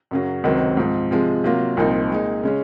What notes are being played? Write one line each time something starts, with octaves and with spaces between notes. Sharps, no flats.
F#2 C#3 F#3
C#2 C3 D#3 F#3 C4
G#2 F3 C4
C3 F3 G#3
C3 F#3 A#3 F4
C2 A#2 F3 C4 D#4
A#2 G#3 D#4
C#3 G#3 C#4